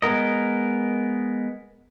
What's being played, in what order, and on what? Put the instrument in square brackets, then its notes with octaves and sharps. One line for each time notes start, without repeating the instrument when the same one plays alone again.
[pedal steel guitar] G#3 B3 A#4 D#5